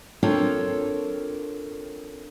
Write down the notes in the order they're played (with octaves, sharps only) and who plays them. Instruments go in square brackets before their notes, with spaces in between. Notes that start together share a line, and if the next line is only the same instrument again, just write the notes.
[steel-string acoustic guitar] C4 D4 F4 A4 A#4 C#5